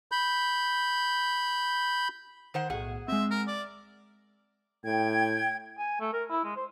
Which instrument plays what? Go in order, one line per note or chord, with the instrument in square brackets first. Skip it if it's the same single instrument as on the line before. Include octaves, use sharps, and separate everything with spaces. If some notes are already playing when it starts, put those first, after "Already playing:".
[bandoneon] B5 G6
[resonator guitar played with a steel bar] D#3 C5 F#5
[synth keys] B1 A2 [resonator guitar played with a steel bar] G#4 F#5
[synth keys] G#3 C4 [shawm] E5
[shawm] A#4
D5
[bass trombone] A2 [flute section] G5 G#6
[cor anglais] G#5
A3
A#4
E4
G#3
C5